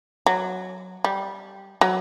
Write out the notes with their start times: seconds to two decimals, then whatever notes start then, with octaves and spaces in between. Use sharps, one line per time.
0.26 F#3
1.04 G3
1.81 F#3